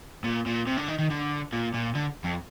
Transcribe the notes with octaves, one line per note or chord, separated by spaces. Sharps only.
A#2
A#2
C3
D3
D#3
D#3
D3
A#2
A#2
D3
F2